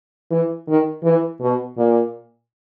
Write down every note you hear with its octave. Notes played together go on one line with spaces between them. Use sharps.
E3
D#3
E3
B2
A#2